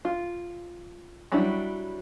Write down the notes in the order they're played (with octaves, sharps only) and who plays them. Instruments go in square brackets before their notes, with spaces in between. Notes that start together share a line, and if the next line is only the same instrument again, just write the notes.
[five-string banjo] F4
F#3 G3 C#4 D4 E4